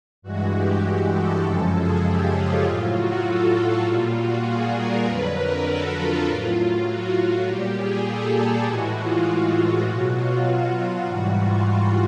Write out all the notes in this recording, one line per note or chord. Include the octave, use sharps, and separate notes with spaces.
G2 E3 G#3 F#4
G4
A4
F#2 C#3 F3 G#3 A4
G#4
G4
F4
A2 F#3 F4
F#4
A4
F4
A#2 G3 F4
F#4
G#4
A#4
F2 D3 F#3 B4
A#4
A4
F4
A2 F#3
F#4
F#4
A#2 G3 G4
G#4
A4
G4
A2 E3 G#3 F#4
F4
B2 F#3 F#4
F4
F#4
F#4
G#2 E3 G3 F#4
F4
F4